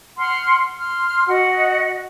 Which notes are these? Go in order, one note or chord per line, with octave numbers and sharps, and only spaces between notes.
F#5 C6 F6
C6 F6
F#4 D#5 F#5